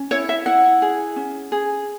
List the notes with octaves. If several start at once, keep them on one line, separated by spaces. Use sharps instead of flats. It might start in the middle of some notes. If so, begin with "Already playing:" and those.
Already playing: C#4
E4 C#5
E5
E4 F#5
G#4
C#4
G#4